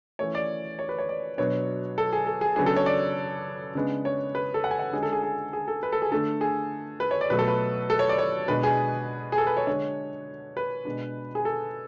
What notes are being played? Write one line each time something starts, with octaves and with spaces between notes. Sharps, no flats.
E3 A3 C#4 C#5
D5
C#5
B4
C#5
D5
B2 F#3 B3 D4 C#5
A4
G#4
A4
G#4
C#3 F#3 B3 D4 G#4
A4
C#5
D5
C#3 G#3 B3 D4
C#5
B4
A4
F#5
G#5
F#5
D3 G#3 C#4 G#4
A4
G#4
G#4
G#4
A4
B4
A4
G#4
D3 A3 D4 A4
G#4
B4
C#5
D5
B2 F#3 A3 B4
A4
B4
A4
C#5
D5
C#5
B2 G#3 D4 B4
G#4
G#4
A4
B4
C#5
D3 G#3 D4 C#5
B4
B2 G#3 B3 D4
G#4
A4